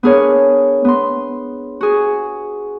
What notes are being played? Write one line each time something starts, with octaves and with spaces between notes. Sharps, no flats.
B3 D4 G#4 A#4 C#5
B3 C6
F#4 G#4